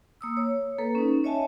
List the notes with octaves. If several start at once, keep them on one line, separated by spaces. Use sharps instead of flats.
A#3 D#6 E6
C#5
A#3 A4 B4
C#4 D#4
C#5 D#5 E5 G#5 A5